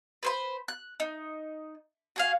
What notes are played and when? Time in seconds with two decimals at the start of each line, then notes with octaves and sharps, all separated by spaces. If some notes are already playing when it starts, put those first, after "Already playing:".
0.23 B4 C5 B5
0.68 F#6
1.00 D#4
2.16 F#4 G#4 F5